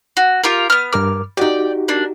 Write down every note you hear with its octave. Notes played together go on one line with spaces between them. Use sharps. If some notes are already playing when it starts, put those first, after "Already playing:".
F#4
F4 G4 A#4
B3 F6
G2 A#4 D6 F6
D#4 F#4 G4 D5 G5
A#3 D4